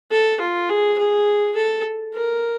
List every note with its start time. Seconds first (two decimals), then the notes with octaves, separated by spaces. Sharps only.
0.11 A4
0.41 F4
0.69 G#4
0.98 G#4
1.56 A4
2.15 A#4